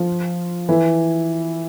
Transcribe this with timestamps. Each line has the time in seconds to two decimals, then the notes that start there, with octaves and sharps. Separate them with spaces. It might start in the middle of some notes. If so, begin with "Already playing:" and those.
Already playing: F3 F4
0.69 E3 E4